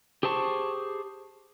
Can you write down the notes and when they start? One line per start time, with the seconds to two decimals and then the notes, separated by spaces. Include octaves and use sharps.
0.23 G4 G#4 C5 A5 C#6